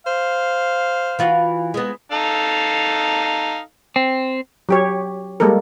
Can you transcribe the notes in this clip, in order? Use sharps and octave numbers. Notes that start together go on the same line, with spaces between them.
C5 F5
E3 F4 F#4
G#3 B3
D#4 A4 F5
C4
F#3 G4 C#5
G3 G#3 A#3 A4 A#4